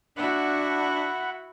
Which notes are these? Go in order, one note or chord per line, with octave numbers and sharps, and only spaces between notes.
D4 E4 F#4 F#5 B5